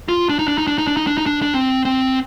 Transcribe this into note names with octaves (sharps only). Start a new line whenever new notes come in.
F4
D4
D#4
D4
D#4
D4
D#4
D4
D#4
D4
D#4
D4
D4
C4
C4